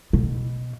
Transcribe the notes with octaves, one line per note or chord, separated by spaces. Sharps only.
B2